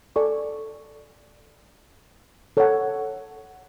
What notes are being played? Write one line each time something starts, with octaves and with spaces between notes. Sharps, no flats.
A4 D5 G#5 C#6
A4 C#5 F#5